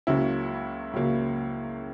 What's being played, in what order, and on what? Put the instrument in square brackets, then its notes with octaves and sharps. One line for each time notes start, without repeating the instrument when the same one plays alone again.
[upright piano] C#2 C#3 F#3 A#3 E4
C#2 C#3 F#3 A#3